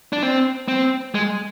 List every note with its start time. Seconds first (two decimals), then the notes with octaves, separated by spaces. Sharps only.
0.13 D4
0.22 C4
0.68 C4
1.15 G#3